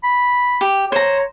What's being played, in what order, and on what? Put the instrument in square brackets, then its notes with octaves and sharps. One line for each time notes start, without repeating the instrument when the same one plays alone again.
[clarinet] B5
[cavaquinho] G4
[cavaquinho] C5 A#5 [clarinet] C#5